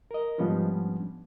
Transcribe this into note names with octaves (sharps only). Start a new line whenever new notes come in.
A#4 D#5
G#2 F3 G3 B3 C#4 D4